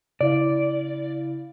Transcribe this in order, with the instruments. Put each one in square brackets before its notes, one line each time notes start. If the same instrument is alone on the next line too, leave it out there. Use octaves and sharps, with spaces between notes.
[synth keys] C#3 E4 F5 [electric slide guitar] D5